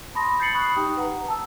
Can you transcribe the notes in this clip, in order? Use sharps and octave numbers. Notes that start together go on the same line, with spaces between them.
A5 B5 C6 D#6 A#6
G6 A6 C7 C#7 F#7
B5 C#6 D#6 F#6
D#4 G4 G5 D#6
B4 F#5 A#5
A5 E6